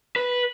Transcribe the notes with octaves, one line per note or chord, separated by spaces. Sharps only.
B4